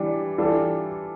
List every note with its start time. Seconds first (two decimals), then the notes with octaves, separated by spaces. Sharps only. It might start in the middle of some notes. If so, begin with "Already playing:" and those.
Already playing: E3 G3 D4
0.38 E3 G3 D4 F4 A4